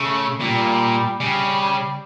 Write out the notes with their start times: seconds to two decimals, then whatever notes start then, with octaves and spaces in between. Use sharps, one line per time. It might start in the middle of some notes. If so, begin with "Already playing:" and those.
Already playing: C#3 A3
0.41 A#2 G3
1.19 C#3 G3